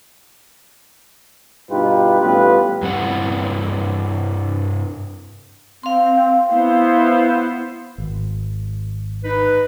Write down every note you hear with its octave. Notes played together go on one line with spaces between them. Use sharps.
G2 B2 D#4 F4 G4 B4
A1 G3 B3 F4 G4 B4
G2 G3 C4 E4 F#5
C4 F5 C6
B3 E4 C5
G#1
D#4 B4